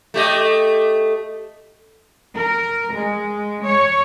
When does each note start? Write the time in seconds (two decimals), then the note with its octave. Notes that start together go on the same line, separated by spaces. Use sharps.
0.14 A3 G4 D#5
2.35 A#4
2.92 G#3
3.64 C#5